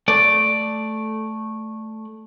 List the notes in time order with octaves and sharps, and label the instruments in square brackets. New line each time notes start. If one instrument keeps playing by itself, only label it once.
[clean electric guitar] A3 D5